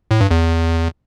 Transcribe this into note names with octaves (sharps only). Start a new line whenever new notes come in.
A2
G2
E2